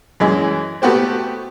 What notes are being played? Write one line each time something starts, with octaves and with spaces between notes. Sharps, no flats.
F#2 E3 G#3
A3 B3 F#4 G4 C5